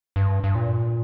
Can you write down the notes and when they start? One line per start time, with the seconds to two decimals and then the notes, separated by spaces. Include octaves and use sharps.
0.16 G2
0.44 G2
0.55 A#2